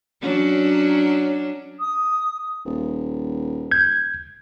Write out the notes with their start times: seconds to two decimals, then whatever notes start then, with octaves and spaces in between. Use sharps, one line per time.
0.22 F#3 C#4 D4
1.80 D#6
2.65 D#1
3.71 G6 G#6